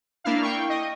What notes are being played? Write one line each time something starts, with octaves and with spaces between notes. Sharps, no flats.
A#3 D4 E4 F5
G5 C#6
D#5